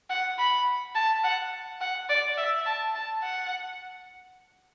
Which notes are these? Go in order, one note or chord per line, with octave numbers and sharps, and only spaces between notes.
F#5
B5
A5
F#5
F#5
D5
E5
A5
A5
F#5